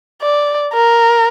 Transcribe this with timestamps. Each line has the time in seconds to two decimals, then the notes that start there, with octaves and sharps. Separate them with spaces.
0.22 D5
0.73 A#4